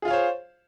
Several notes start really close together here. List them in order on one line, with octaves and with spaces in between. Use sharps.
G#4 F4 F5 C#5 C5